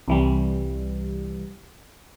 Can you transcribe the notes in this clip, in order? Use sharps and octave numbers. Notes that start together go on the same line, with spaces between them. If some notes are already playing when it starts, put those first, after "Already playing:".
C2 E3 G3